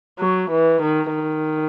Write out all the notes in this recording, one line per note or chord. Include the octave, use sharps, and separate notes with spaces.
F#3
E3
D#3
D#3